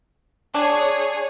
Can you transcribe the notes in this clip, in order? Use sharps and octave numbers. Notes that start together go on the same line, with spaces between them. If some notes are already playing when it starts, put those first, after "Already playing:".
D4 G#4 C#5